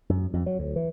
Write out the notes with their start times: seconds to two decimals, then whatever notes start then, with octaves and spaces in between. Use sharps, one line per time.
0.09 F#2
0.33 F2
0.46 F#3
0.59 D2
0.76 E3